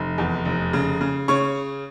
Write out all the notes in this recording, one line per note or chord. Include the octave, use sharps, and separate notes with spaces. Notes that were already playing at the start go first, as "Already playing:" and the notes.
Already playing: F1
E2
F1
C#3
C#3
C#3 C#5 C#6